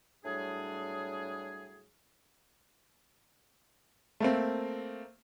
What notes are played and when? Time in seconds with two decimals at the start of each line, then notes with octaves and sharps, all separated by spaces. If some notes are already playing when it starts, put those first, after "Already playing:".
0.25 A2 F#3 G3 D4 G#4
4.20 A3 A#3 C4